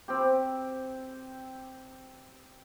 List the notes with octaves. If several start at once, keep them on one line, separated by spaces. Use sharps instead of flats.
C4 G4